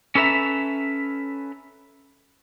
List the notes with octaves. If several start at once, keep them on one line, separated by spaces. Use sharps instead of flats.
C#4 A4 B4 C#5 E5 A#5